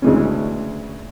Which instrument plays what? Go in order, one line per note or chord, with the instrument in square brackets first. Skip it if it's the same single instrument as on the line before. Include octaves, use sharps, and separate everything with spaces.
[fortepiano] D2 C#3 E3 G#3 C#4